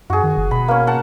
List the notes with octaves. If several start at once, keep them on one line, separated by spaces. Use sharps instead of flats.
F#2 F#4 G#4
D#3
F#1
B2 B5
A#3 C#4
F#5 A5